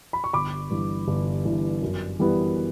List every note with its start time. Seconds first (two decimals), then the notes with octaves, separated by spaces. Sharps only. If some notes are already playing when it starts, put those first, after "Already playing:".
0.13 B5
0.24 C#6
0.33 G1 B5 D6
0.70 G2 E3
1.08 G1
1.45 G2 E3
1.82 F#2
2.19 E3 G3 B3